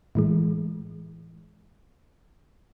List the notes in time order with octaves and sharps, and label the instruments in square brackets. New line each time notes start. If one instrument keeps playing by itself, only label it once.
[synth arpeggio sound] A2 E3 G#3